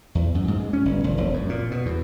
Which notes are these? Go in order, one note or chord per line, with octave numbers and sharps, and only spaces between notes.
E2
F#2
G#2
G#3
C#4
G1
E1
E1
F#2
A#2
B2
E2